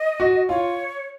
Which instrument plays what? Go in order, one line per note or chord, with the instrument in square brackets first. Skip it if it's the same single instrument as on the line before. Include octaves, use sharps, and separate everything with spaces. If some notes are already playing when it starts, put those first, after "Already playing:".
Already playing: [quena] D#5
[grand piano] F#4
[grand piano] F4 [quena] C#5